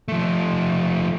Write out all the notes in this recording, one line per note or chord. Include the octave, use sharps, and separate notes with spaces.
F3 A3